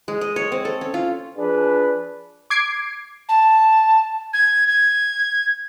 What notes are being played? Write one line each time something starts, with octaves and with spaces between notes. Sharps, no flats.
G#3
D#5
C#5
C4
A4
C#4
F4
F3 D4 G#4 B4
D6 G#6 C7 D7
A5
G#6
G#6